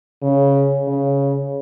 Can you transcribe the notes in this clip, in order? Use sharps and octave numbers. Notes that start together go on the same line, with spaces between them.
C#3
C#3